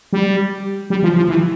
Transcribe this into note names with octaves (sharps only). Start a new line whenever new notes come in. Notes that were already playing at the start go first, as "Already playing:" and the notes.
G3
G3
F3
F3
E3